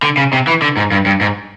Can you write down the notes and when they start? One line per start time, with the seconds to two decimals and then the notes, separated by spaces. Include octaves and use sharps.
0.03 D3
0.17 C#3
0.33 C3
0.47 E3
0.62 D3
0.77 G#2
0.92 G2
1.06 G2
1.21 G#2